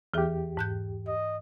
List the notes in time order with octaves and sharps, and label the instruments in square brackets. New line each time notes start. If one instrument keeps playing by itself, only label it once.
[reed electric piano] E2 G4 [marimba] E3 G#4 E5
[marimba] G#2 F#6 G6
[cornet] D#5